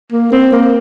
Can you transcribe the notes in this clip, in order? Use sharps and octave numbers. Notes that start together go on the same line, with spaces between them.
A#3
C4
A#3